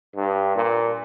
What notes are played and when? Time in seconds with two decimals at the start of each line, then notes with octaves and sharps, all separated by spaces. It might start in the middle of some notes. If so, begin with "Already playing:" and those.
0.16 G2
0.56 A#2